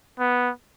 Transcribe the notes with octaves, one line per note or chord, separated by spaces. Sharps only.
B3